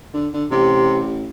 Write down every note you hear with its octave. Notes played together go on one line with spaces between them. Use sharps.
D3
D3
A1 C3